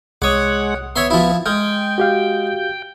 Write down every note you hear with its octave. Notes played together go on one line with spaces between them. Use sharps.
C2 G#3 C#5 F#5 D6 D#6
B3 C#5 E5 C6
F3 E4
G#3 G5 F6
F#4 G4 F5